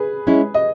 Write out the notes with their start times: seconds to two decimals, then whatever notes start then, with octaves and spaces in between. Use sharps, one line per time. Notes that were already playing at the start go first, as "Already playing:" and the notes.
Already playing: G#4 B4
0.27 G#3 C#4 E4
0.54 D#5